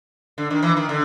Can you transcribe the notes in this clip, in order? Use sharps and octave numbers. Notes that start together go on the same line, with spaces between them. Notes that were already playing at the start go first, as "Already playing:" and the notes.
D3
D#3
E3
D#3
D3